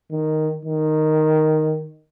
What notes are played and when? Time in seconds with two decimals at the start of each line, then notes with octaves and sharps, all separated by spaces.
0.11 D#3
0.65 D#3